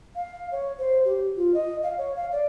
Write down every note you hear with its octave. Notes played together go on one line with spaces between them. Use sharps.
F5
C#5
C5
G4
F4
D#5
F5
C#5
F5
D5